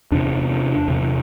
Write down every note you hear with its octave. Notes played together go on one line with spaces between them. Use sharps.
E2 C3 D4
E2 C3